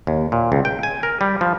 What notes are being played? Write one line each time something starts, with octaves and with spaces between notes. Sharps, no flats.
D#2
A#2
C#2
G5
G#5
A#4
G3
F3